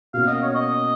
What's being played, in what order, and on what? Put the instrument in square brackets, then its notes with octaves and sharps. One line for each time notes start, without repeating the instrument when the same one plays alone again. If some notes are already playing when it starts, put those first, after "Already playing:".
[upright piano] B2 A#3 C#4 F#4 [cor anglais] F5
[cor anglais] D#5
C#5
D#5